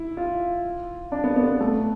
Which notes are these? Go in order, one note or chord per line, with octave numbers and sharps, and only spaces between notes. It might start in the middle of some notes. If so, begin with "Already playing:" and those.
Already playing: E4
F4
D4
B3
B3
B3
A3